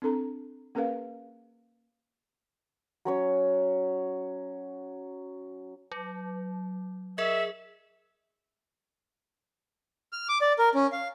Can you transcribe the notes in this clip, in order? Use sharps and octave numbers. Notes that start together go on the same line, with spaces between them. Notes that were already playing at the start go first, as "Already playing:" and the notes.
C4 D4 A4 A#5
A#3 C#4 G#4 A#4 B4 F5
F#3 C#4 C#5
F#3
G#4 A#4 D#5 E5
F6
D6
D5
A#4
C#4
F5